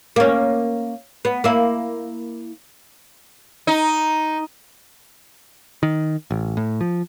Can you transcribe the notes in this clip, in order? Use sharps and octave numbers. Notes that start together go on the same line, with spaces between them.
A#3 C#4
B3
A#3 E4
D#4
D#3
A1
A2
F3